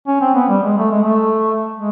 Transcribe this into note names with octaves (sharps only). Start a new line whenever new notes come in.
C#4
C4
B3
G3
G#3
A3
G#3
A3
G#3